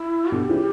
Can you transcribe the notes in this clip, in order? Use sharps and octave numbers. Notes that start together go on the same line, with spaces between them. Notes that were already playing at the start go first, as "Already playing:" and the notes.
Already playing: E4
B2 D3 G4
C#3 E3